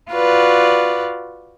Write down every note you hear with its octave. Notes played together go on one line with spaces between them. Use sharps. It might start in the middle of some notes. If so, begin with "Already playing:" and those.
F4 F#4 B4 D5